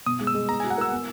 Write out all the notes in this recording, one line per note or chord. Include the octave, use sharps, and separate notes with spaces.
B2 D#6
G#3
E6
G#3
B3 A#5
G#5
F#4
F#5
A#4 E6
B3